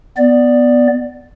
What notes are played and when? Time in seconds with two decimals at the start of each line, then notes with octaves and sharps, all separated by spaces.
0.17 B3 D5